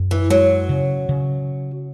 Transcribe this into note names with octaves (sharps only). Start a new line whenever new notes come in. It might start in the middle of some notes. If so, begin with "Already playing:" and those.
Already playing: F#2
E3
F#3 G#3
C#3
C#3